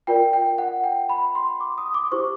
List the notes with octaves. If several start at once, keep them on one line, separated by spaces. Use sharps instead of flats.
F4 A#4 D5 G5
G5
F#5
G5
B5
C6
D6
D#6
D6
E4 G4 C5 C#6